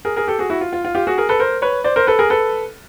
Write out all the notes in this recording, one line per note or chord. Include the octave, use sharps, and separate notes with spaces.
G#4 A#4
G#4 A#4
G4 A4
F#4 G#4
E4 F#4
F4
F4
F4
F4 G4
F#4 G#4
G#4 A#4
A4 B4
A#4 C5
B4 C#5
C5 D5
A#4 C5
A4 B4
G#4 A#4
A4 B4